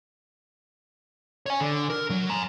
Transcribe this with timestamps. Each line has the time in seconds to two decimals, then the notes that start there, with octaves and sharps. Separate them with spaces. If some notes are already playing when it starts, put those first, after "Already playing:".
1.46 C#5 G#5
1.60 D3
1.90 A#4
2.10 F#3
2.30 G#5 A#5